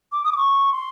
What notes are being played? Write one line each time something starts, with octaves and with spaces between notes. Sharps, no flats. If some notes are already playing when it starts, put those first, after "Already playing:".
D6
D#6
D6
C#6
C6